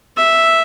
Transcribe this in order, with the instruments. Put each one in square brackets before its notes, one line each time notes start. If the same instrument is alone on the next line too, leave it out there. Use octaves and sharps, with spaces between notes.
[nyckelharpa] E5